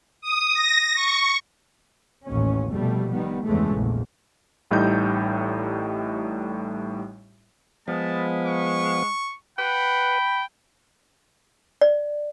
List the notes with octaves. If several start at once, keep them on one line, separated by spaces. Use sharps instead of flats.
D#6
A#6
C#6
A1 D#2 C#4
F1 B2 G3 A3
D#3 G3 B3
E2 G2 C#3 E3 G#3 A3
A#1 E2
A1 A2 G3 D#4 G6
F3 G#3 B3 A5
C#6
B4 F#5 G5 B5
D5